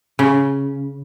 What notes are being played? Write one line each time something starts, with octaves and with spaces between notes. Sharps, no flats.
C#3